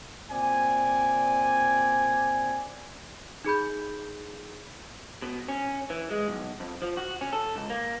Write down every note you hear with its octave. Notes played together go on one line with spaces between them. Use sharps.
A#2 C4 D5 G#5
D#4 G#4 B5 G6
B2
C#4
E3
G#3
B1
F2
F3
F#4
C#4
A4
C#2
A#3